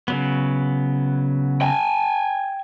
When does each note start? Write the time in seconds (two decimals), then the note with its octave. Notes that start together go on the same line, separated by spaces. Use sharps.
0.08 C#3 F#3 B3
1.62 G5 G#5